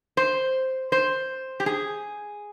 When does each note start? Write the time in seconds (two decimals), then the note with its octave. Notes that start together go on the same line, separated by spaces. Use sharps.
0.17 C5
0.92 C5
1.60 G4
1.66 G#4